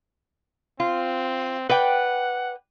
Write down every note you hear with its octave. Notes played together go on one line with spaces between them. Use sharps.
C4 F4
B4 D5 F#5 G5